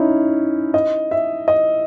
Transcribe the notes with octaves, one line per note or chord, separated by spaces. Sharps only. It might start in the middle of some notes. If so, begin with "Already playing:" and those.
Already playing: C#4 D#4 E4
D#5
E5
D#5